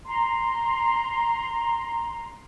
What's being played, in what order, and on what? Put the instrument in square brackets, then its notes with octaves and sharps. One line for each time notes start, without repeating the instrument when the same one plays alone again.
[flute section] A#5 C6